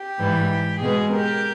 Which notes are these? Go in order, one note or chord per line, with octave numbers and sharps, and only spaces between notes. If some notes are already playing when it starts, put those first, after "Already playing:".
Already playing: G4
G#2 E3 G3
B2 G#3 B3 G#4
G4 A#4